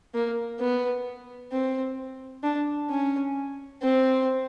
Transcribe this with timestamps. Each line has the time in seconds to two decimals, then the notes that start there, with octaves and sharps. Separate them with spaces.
0.14 A#3
0.59 B3
1.52 C4
2.43 D4
2.90 C#4
3.83 C4